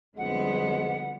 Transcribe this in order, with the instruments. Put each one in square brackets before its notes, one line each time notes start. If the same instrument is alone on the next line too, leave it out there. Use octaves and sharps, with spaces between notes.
[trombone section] B1 F2 G#3 [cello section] D3 G3 B3 [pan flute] F#5